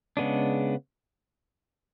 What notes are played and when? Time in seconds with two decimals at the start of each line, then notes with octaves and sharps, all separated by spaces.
0.17 C#3 G#3 B3 D4